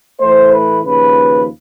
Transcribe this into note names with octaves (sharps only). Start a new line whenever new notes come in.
A2 E3 A3 C5
B4
D#2 C#3 F3 B4